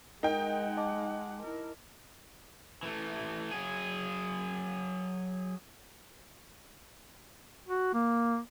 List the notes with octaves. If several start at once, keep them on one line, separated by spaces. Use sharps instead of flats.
G#3 D#4 A#4 F#5 G5
D#5 A5 D6
E4 A#4
E3 A3
F#3 G#4
F#4
A#3